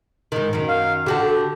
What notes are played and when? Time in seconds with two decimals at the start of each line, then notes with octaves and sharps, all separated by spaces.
0.32 G#2 D#3
0.53 F#2 D#3
0.68 F5
1.06 D3 F#4 G4 A4